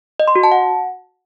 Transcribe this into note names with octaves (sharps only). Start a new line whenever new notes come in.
D#5
C6
F#4
A5
F#5